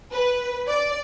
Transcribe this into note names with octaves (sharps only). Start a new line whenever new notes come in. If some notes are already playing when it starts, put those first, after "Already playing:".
B4
D5